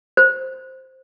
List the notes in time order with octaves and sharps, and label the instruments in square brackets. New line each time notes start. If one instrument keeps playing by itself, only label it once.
[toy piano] C5